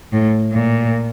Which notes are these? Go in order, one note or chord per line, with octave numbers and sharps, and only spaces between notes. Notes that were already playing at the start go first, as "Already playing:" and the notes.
A2
A#2